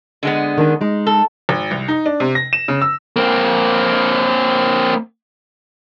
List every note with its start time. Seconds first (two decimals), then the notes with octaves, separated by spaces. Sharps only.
0.23 D3 G#3 B3
0.58 D#3 D4
0.81 G#3 D#4
1.07 A4
1.49 G#1
1.71 C2
1.88 D#4
2.06 D4
2.20 C3
2.35 A#6
2.53 E7
2.68 C#3
2.82 E6
3.16 A#3 C4